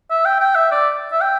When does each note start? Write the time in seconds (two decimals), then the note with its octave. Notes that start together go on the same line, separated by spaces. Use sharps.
0.10 E5
0.25 G5
0.41 G5
0.55 E5
0.72 D5
1.12 E5
1.21 G5